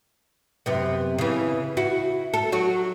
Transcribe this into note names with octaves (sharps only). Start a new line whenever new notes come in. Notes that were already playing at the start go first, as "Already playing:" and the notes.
F#2 C3 B3
C#3 E3
E4 F#4
A4
F#3 F#4